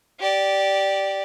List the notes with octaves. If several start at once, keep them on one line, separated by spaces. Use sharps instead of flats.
G4 D5